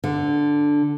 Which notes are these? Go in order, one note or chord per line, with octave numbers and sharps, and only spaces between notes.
D3